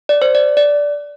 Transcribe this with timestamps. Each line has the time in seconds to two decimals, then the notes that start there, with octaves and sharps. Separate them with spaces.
0.09 D5
0.22 C5
0.35 D5
0.57 D5